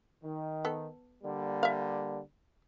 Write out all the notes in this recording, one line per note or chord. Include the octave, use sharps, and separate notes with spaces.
D#3
B3 A4
D3 G3 A#3
E5 F5